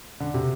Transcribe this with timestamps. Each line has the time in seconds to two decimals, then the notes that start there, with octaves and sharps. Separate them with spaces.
0.20 D3
0.34 C3